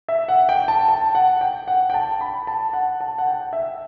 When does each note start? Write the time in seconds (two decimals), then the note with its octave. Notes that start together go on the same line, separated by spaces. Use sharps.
0.08 E5
0.28 F#5
0.49 G5
0.68 A5
0.88 A5
1.15 F#5
1.41 G5
1.68 F#5
1.90 G5
1.94 A5
2.21 B5
2.47 A5
2.73 F#5
3.01 A5
3.18 F#5
3.27 G5
3.53 E5